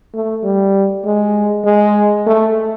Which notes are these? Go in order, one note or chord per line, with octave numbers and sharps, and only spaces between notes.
A3
G3
G#3
G#3
A3